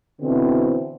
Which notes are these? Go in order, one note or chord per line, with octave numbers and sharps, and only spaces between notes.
B2 D3 E3 B3 C4